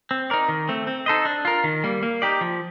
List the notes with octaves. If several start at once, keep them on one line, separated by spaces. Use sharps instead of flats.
C4
D#4 A#4 D5
D#3
A3 C4
C4
D#4 A4 C5 D#5
D4
F4 A#4
D#3
G3 A#3
A#3
D#4 G4 D5
F3